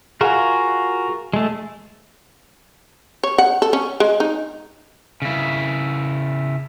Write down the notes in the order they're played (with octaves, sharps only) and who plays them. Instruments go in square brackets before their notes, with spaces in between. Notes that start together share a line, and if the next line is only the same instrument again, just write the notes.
[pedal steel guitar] F4 F#4 A#4 [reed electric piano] G#4 F#5 G#5
[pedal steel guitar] G#3 A3
[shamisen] C#5
F#5
A4
C#4
G#3
D#4
[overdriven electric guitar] C#3 E4